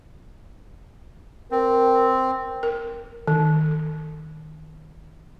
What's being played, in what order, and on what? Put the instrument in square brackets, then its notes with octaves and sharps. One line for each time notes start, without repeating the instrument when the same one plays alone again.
[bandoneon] C4 [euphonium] A#4
[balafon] A#4
D#3